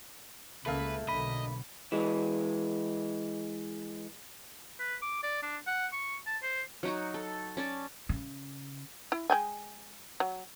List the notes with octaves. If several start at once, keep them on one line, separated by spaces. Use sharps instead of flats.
C#2 C#3 A3 A#3 B4 E5
B1 D3 D#5 B5
E3 G#3
B4
D6
D5
D4
F#5
C#6
A5
C5
F#3 D#4 F#4
A4
C#4 D5 A5
C#3
E4
G#3 G5 G#5
F#3